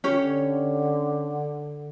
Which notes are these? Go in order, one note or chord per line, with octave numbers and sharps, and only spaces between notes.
D3 C#4 G4 C#5